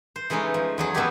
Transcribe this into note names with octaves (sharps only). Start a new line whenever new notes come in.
C5
E3 G#3 A3 C#4 D#4
F3
E2 F#3 G#4
B2 A3 B3 C4 E4 G4